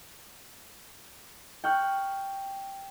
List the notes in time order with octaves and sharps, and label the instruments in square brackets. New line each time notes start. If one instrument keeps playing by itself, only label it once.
[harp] G5 C#6 F6 F#6